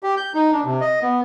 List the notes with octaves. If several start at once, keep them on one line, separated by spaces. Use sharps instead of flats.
G4
G6
D#4
D4
C3
D#5
B3